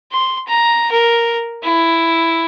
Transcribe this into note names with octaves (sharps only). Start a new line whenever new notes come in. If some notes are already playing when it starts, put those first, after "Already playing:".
C6
A#5
A#4
E4